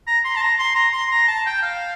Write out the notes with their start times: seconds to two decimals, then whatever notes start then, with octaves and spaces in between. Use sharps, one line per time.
0.07 A#5
0.24 C6
0.36 A5
0.42 A#5
0.59 C6
0.75 A#5
0.93 C6
1.11 A#5
1.28 A5
1.46 G5
1.63 F5